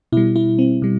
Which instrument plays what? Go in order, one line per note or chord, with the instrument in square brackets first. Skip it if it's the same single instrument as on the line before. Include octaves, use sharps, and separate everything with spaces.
[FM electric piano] B2 G3 E4
E4
C4
B2 G3